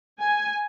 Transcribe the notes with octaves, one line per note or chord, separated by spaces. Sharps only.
G#5